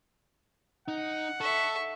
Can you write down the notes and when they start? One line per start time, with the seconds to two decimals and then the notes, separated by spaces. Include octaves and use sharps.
0.88 D#4 F#5
1.41 A4 E5 C#6